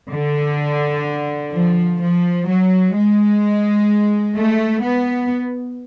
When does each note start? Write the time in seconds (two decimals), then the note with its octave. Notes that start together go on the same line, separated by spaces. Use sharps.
0.12 D3
1.54 F3
2.01 F3
2.49 F#3
2.95 G#3
4.37 A3
4.84 B3